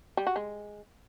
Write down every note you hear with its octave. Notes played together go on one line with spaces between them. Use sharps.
G3
F#4
G#3